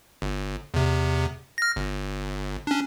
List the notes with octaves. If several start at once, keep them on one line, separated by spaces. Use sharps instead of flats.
G1
E2 C3
F6 A#6
G1
C#4 D4